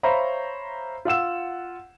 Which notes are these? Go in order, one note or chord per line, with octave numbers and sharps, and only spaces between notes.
C5 C#5 E5 F5 A#5 B5
F4 F#5 E6 E7